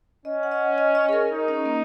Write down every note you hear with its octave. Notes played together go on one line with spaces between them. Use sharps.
C#4 D#5
F#5
D#5
D#5
D#5
G#4
A#4
D#4
C#4
A#3